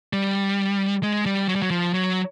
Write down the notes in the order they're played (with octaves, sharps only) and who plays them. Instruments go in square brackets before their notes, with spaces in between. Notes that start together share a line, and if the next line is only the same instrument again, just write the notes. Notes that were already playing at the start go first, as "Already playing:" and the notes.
[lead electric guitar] G3
G#3
G3
F#3
G3
F#3
F3
F#3